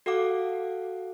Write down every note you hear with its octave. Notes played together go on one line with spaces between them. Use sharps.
F#4 A4 F5 F#5 D6